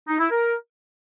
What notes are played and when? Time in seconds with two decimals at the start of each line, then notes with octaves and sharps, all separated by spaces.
0.08 D#4
0.19 E4
0.31 A#4